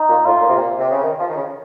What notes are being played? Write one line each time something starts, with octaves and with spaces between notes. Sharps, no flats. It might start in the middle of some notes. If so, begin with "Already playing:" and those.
Already playing: D#4
A#2
A2 F4
A#2
C3
A#2
C3
C#3
D#3
F3
D#3
C#3